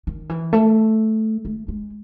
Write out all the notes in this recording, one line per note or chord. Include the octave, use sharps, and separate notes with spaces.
D#3
E3
A3
A3
G#3